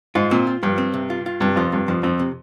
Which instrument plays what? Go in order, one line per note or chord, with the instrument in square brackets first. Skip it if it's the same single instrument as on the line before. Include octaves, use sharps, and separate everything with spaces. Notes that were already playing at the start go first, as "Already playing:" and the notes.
[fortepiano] G#2 [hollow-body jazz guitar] F4
[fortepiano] A#2 [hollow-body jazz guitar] C4
[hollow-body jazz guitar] F4
[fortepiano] G2 [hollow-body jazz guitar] F3
[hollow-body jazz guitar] C4
C3
F4
F4
[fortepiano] G2 [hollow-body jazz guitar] C3
[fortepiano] F2 [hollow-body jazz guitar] F4
[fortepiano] G2 [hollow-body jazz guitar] C3
[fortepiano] F2 [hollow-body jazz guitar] F3
[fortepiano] F2 [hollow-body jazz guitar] C4
[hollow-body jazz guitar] C3